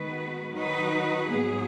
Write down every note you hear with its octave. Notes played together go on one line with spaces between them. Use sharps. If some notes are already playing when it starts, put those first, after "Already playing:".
Already playing: D#3 G#3 B3 F#4 B4
D#3 F#3 D#4 F#4 B4
G#2 F#3 B3 G#4